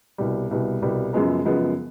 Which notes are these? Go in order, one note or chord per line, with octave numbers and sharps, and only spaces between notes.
C2 B2 G3
C2 B2 G3
C2 B2 G3
F#2 C#3 F3 G#3 B3
F#2 C#3 F3 G#3 B3